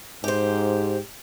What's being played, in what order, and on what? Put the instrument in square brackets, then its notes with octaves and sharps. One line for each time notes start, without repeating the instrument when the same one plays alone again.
[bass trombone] G#2 [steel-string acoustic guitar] G4 C5